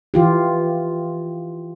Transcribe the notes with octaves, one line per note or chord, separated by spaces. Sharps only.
E3 F4 G4